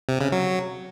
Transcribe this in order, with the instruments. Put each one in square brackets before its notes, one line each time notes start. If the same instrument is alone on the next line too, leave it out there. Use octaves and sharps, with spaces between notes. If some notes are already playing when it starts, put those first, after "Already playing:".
[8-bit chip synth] C3
C#3
F#3